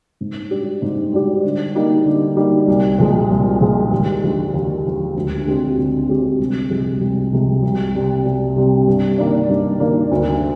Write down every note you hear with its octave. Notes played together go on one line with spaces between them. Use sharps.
G#2
G3 D4 G4
G#2
G3 D4 G4
D3
G3 A#3 D#4 G4
D3
G3 A#3 D#4 G4
C2
A#2 F3 G#3
C2
A#2 F3 G#3
D#2
D3 F3 G#3
D#2
D3 F3 G#3
D2
D3 G#3 C4 G4
D2
D3 G#3 C4 G4
C2
C3 F3 G#3
C2
C3 F3 G#3
C2
C3 G3 C4
C2
C3 G3 C4
G2
D#3 A#3 D4
G2
D#3 A#3 D4
D2